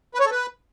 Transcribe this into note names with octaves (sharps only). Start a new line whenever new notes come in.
B4
C#5
A4
B4